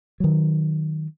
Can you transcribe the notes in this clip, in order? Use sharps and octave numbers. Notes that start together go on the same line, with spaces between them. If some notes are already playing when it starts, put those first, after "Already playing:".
D#3 F#3